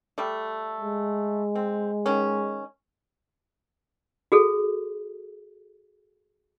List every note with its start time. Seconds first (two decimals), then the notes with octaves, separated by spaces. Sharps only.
0.18 G3 A3
0.81 G#3
1.55 C4
2.06 D#3 C#4
4.32 F#4 G#4 A4